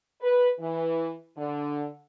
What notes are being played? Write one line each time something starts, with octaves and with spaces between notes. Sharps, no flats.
B4
E3
D3